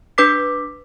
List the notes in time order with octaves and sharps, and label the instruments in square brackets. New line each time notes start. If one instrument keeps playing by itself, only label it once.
[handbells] D4 B4 D6 B6